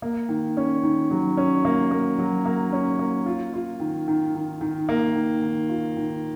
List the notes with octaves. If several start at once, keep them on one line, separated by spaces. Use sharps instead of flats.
A#3
D#3
C#4
D#3
F#3
C#4
A#3
A#3
F#3
A#3
C#4
A#3
F4
F4
D#3
D#3
D#3
D#3
A#3
D#3
D#3
F4
D#3